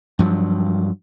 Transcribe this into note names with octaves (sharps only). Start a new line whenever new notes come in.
G2 F3 F#3